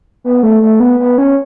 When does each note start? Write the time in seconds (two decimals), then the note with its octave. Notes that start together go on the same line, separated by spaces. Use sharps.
0.24 B3
0.43 A3
0.62 A3
0.80 B3
1.00 B3
1.18 C#4